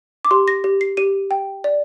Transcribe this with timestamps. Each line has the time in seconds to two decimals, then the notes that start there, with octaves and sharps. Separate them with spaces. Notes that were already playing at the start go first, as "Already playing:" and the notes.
0.25 D6
0.31 G4 C6
0.48 A#6
0.64 G4
0.81 C7
0.97 G4 D#7
1.31 G5
1.64 D5